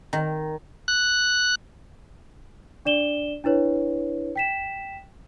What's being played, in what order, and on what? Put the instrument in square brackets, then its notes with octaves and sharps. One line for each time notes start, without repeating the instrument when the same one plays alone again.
[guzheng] D#3
[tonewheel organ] F#6
[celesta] D4 D5 E7 G7
D4 E4 B4 C#5
G5 B6 E7